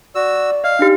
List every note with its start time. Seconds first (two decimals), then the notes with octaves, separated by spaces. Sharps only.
0.15 F#4 D5 E6
0.64 D#5 F5
0.79 D4 D#4 G4